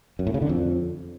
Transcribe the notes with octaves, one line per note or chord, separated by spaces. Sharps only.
F#2
A2
C#3
D3
F2